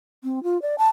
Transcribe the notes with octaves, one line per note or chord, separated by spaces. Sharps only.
C4
F4
D5
A5